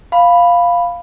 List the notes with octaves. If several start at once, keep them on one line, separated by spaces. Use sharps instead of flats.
F5 B5